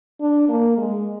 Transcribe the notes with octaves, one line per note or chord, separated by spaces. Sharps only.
D4
A#3
G#3